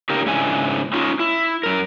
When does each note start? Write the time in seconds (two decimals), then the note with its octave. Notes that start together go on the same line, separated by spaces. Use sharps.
0.10 C#3 D#4 G4 A#4
0.26 G#2 C#3 D4 E4 G#5
0.93 C#4 D#4 F4
1.20 E4
1.63 F#2 A#4